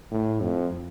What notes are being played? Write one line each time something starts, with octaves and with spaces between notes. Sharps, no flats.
A2
F2